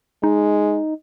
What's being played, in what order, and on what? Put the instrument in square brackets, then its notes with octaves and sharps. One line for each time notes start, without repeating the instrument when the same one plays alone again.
[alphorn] G#3 [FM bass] D#4